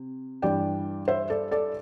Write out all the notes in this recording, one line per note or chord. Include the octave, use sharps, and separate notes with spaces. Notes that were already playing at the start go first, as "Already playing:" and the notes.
Already playing: C3
G2 E3 G3 D4 D5 G5
C5 E5
A4 D5
A4 D5